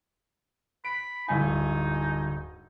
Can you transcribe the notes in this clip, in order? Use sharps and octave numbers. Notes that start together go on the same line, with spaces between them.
B5 D7
D1 G2 D#4 G#5